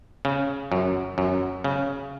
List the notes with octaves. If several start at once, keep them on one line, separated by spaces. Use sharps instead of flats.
C#3
F#2
F#2
C#3